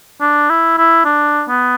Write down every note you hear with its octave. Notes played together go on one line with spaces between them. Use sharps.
D4
E4
E4
D4
B3